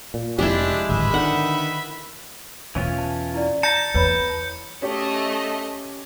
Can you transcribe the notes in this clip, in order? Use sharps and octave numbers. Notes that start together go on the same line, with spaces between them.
A#2
F1 G#3 D4 E4 G4
D1 G#1 B4 E5 B5
D3 D#3 F#5
E2 B2 E3 C#4 F4
A5
E4 D5
A5 A#5 G6 C#7
E2 B4 C#5 B5
A3 C#4 G4 D#5